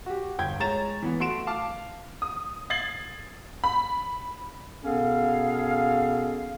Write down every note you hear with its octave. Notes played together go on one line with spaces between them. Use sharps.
F#4 G4
G1 G5 G6 G#6
G#3 C#5 A#5 A6 E7
E3 B3
A3 F#4 C6 D7 E7
F5 A5 D6 F6
D#6
G#6 A6 C7 F#7
B5
B2 B3 C#4 G#4 A4 F5